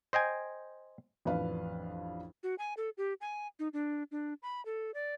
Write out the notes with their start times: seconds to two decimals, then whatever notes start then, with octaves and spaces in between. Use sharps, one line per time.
0.13 C5 D#5 G5 G#5
1.25 A1 F2 D4 B4 F5
2.43 F#4
2.59 G#5
2.77 A4
2.98 G4
3.21 G#5
3.59 D#4
3.73 D4
4.12 D4
4.43 B5
4.65 A4
4.94 D5